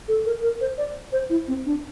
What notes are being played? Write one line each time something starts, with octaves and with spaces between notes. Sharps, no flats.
A4
A#4
A#4
C5
D5
C5
E4
C4
D4